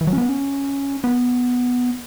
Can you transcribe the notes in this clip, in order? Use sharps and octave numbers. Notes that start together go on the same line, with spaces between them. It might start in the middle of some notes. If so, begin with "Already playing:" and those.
E3
F#3
C#4
B3
C#4
B3